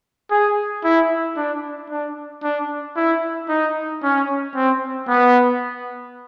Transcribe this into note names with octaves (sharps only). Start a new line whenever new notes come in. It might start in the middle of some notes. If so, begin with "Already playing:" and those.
G#4
E4
D4
D4
D4
E4
D#4
C#4
C4
B3